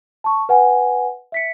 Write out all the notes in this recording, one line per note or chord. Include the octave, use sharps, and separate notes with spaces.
A5 C#6
B4 F#5 G#5
E5 B6 C#7